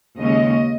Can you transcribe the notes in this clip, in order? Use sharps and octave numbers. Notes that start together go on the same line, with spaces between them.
D#2 C#3 G#3 C#4 D#5